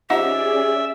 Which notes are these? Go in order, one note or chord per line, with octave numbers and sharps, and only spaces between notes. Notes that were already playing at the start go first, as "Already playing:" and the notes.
F3 C#4 D#4 G4 G#4 D5 E5 F#5